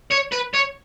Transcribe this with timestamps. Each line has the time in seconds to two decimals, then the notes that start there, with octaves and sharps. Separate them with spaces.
0.12 C#5
0.33 B4
0.55 C#5